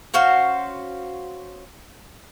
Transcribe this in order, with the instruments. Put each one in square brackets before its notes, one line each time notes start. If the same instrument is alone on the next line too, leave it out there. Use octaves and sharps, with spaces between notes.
[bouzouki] C#4 F#4 C5 F5